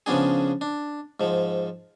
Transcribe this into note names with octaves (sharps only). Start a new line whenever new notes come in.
C#3 F3 B3 D4 G#4
D4
G#2 F3